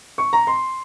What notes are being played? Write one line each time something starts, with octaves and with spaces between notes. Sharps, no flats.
C#6
A#5
C6